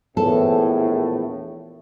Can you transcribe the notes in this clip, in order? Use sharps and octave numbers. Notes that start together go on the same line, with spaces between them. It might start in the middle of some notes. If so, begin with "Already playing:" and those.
A#1 E2 A2 A4